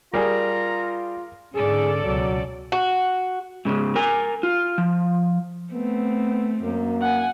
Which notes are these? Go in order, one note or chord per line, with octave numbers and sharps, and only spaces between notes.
G3 F4 G#4 A#4 A#5
G#2 D3 C#4 G#4 A4 D5
C#2 B2 F#3
F#4
G#2 C#3
A#4 G#5
F4
F3
A3 B3 C4
F#2 A#3
F#5 G#5